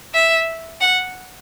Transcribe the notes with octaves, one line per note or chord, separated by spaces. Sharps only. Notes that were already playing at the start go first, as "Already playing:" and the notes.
E5
F#5